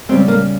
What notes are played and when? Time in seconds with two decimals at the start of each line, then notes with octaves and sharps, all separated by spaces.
0.09 C#3 G3 C4
0.28 A#3